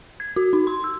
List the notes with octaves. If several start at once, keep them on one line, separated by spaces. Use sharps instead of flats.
G#6
F#4
D#4
C6
E6